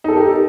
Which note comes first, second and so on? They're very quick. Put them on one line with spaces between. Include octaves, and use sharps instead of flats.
D#4 A4 A#4 G4